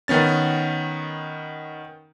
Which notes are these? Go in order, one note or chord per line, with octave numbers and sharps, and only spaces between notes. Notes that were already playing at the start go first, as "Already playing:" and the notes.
D#3 B3 C#4 A6